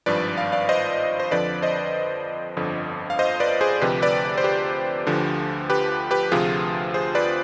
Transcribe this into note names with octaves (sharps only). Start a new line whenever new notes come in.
G#1 G2 F3 B4 D5
F5
D5 F5
C5 D#5
C5
F2 D3 F3 B4 D5
C5 D#5
G1 F2 D3 F3
F5
C5 D#5
B4 D5
G#4 C5
D2 C3 F3 G4 B4
B4 D5
C5
G4 B4
D2 D3 F3
G4 B4
G4 B4
D2 C3 F3 F4 G#4
G#4 C5
B4 D5